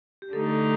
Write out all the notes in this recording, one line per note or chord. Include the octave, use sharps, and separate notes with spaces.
G4
D3 A3 D#4 A4